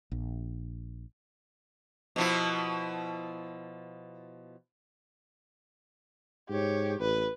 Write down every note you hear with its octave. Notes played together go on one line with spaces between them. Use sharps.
A#1
B2 F3 E4
G#2 G4 C#5
A1 B4